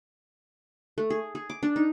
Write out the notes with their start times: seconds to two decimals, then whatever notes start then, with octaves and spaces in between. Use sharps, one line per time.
0.98 A3
1.10 G#4
1.35 G#4
1.50 D6
1.63 D4
1.76 D#4